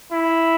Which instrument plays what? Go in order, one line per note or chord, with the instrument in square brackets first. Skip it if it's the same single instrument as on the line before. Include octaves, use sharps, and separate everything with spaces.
[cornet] E4